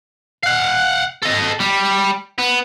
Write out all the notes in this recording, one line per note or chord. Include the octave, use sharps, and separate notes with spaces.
F5 F#5
A4 D#5
G3
B3